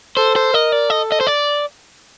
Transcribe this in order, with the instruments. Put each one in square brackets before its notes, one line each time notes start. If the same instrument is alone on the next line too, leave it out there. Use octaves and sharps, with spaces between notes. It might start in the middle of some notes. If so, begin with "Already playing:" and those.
[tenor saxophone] A4 [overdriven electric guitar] C5
[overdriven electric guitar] C5
[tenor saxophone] A#4 [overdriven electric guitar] D#5
[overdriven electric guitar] D5
[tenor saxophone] A4 [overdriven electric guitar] D#5
[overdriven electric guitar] D#5
C5
D5